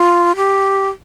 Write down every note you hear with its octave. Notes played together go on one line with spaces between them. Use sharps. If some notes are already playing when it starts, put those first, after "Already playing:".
Already playing: F4
G4